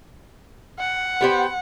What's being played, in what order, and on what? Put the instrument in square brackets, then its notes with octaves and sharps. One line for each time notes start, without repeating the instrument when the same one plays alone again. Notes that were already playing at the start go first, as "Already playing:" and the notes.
[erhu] F#5
[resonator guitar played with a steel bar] B3 G4 C5